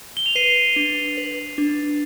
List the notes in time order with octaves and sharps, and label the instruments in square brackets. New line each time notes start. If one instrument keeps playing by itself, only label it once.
[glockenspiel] G7
F7
[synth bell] B4 [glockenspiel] C7 D#7
[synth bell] D4
B4
D4